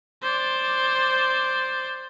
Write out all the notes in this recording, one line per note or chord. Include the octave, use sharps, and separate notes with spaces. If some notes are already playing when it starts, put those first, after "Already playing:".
C5 D5